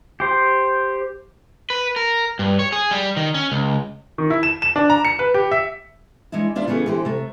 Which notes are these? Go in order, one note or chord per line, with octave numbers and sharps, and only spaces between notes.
G4 C5
B4
A#4
G2
C#5
G#4
G3
D#3
C#4
C#2
D#3
E4
E7
E7
D4
A#5
C#7
B4
G4
E5
E3 G#3 D4 E4
E2 D4 F4 D5 E5
C#3 E3 A3 B3 C#4 G#4
D3 E3 G4 A#4 C5
C3 A3